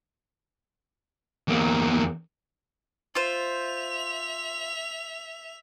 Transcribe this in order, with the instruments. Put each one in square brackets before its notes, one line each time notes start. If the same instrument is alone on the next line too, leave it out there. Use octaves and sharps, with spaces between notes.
[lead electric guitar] E2 A#3
[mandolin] F4 C5 [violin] E5 F7